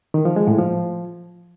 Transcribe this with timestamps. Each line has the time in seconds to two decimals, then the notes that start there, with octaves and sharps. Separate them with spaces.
0.14 D#3
0.25 F3
0.36 G#3
0.47 A2
0.59 F3